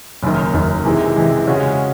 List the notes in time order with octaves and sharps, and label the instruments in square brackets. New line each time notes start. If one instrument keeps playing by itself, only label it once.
[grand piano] F#1 F#2 D#3
F#1 F#2 D#3
C3 E3 G#3
C3 E3 G#3
C#3 G#3 C#4 F#4